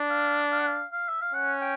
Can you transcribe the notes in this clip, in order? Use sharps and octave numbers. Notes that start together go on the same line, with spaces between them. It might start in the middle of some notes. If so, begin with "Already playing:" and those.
Already playing: D4
F5
F5
F#5
F5
F5
E5
F5
C#4 F#5
G5